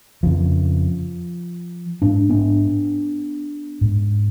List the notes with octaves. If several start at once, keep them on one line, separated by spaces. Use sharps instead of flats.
F2 C#3 F3
G#2 D4
B3 D4
G#2